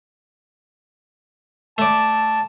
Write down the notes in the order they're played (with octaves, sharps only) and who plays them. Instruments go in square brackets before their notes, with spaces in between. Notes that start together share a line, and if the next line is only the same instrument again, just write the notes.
[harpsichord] A3 D5 [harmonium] A5